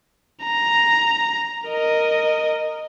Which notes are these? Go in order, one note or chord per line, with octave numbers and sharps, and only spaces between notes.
A#5
A#4 D#5